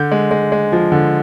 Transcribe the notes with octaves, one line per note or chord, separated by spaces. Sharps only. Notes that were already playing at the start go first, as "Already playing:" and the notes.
Already playing: D3 G6
G#3
G#3
G#3
F3
D3